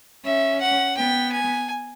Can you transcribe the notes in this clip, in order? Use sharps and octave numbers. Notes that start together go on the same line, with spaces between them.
C#4 E5
F#5
B3 G5
G#5